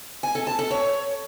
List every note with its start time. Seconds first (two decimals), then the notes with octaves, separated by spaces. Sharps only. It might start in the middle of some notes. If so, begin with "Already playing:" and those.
0.23 G#5
0.35 A4
0.47 A5
0.59 A4
0.71 C#5